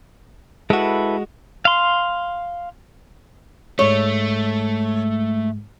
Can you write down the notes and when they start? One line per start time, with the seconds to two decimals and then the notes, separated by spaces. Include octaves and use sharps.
0.70 G#3 E4 F#4 A4 B4
1.65 F5 C6
3.79 G#2 G#3 A3 C#5